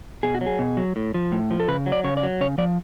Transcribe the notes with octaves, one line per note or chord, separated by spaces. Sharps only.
B2 G#4
F#4
F#3
G#4
B2
F#3
A2
F3
A2
F3
A4
C#3 B4
F#3
D5
C#3 C#5
D5
F#3
C#3 C#5
F3 D5